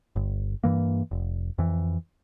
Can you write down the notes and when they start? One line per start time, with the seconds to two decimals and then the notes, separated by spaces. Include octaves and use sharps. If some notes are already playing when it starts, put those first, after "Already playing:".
0.16 G1
0.64 G2 E3 A#3
1.11 F1
1.58 F2 E3